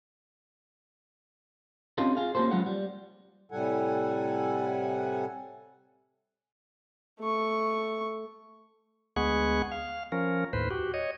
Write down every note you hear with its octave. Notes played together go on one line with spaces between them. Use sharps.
C4 C#4 D#4 F4 G4 A4
F4 G#4 F5
A#3 C#4 D4 G4 A4 C5
F#3 G#3 B3 C#4 F4 F#5
G3
A2 C3 G3 A4 F#5 G#5
A3 C#6
D2 G#3 B3 G#4 F#5 C#6
F5
F3 C#4 A#4
D#2 A2 B4 C5
F#4 G4
C#5 D#5